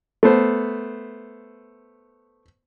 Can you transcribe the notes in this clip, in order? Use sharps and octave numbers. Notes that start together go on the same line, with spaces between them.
A3 B3 C5